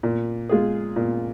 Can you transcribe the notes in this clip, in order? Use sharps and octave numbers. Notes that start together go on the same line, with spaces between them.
A#2
G#3 F4 G#4
A#2